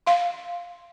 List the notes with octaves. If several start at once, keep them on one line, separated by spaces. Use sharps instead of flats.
F5 C6